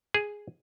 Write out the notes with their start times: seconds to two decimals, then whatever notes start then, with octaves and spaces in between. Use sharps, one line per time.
0.14 G#4